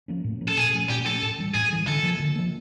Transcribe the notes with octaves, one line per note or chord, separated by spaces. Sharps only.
F3 A#3 C#4
A2
F3 A#3 C#4
A4
A#2 G#4
F3 A3 C#4
A#2 G4
F3 A3 C#4 A4
A2
E3 G3
A2 G#4
E3 G3
D3 A4
F3 A#3
D3
F3 A#3